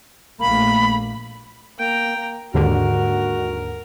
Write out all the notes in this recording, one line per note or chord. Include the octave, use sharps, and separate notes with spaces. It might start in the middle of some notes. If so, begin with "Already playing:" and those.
A#1 A3 A#3 B5
A#3 G5 A#5
A#3
D#2 G#2 D3 F#4 A#4